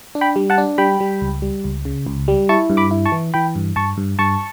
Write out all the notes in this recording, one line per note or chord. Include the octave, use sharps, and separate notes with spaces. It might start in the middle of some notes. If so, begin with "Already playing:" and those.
D4
G5 B5
G3
F#5 A5
D4
G3 G5 B5
G3
C#2
G3
C#2
C#3
C#2
G3
E4 A5 C#6
G2
B5 D6
E4
A5 C#6
E3
E3 G5 B5
G2
G2 A5 C#6
G2
G2 A5 C#6